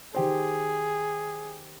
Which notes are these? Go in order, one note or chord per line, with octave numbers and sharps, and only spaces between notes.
D#3 G4 G#4 C5